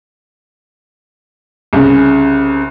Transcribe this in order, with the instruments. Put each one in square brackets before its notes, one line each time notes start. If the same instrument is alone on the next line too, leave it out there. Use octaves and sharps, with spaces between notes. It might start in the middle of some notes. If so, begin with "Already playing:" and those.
[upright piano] C2 C#3